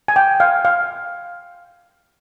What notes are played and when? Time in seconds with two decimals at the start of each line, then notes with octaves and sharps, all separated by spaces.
0.08 G#5
0.16 G5
0.40 F5
0.65 F5